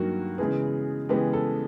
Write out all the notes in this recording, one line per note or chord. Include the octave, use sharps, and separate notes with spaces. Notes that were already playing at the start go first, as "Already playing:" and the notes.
Already playing: G2 D#3 F#3 A#3 F#4 G4
C#3 E3 G#3 B3 G#4
C#3 E3 G#3 B3 G4
A4